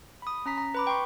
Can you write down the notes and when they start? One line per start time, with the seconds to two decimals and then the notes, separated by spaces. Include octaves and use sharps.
0.22 B5 D#6
0.46 C#4 A#5 B6
0.58 A#5
0.74 B4 B5 D6
0.87 G5 C6 C#6